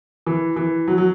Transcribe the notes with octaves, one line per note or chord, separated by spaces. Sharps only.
E3
E3
F#3
F#3